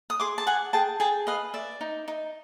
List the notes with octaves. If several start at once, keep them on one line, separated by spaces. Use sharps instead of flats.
D#6
G#4 C6 D6
A5
G#4 F#5 G#5
G#4 G5 A5
G#4 G5 A5
B4 D#5 F5
D5 E5
D#4
D#4